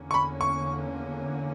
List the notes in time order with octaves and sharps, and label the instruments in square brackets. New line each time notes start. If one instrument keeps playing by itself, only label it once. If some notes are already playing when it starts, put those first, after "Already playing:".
Already playing: [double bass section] E2 D3 A#3 C#4
[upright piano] C#6
B5
C#6